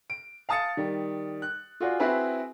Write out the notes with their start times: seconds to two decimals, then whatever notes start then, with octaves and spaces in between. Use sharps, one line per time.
0.10 D7
0.49 F5 A5 D#6 A6 C#7
0.77 D#3 G3
1.42 F#6
1.80 F4 F#4 G#4 D5
2.00 C4 E4 F#4 G#4 B4